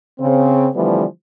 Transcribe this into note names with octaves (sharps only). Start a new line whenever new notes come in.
C#3 C4
D3 E3 F3 G3 A3 B3